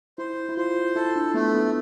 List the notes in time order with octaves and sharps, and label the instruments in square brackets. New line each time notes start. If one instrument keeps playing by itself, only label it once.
[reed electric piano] E4 [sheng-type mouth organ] C5
[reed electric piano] E4
[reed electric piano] F4 [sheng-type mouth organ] C5
[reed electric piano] E4 [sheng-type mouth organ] A4
[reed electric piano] D4
[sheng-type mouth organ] A3 [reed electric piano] B3
[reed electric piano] B3